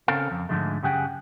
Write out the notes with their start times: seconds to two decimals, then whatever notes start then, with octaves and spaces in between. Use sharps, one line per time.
0.08 C#3 C4 C#4 A4 A#4 F5
0.31 F2
0.49 G#2 D3 F3 G#3 A3
0.83 F#2 C#3 G4 G#4 F#5 G5